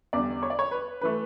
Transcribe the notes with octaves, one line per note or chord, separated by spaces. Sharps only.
E2 D3 G3 D5
C#5
D5
C#5
B4
E3 A3 B4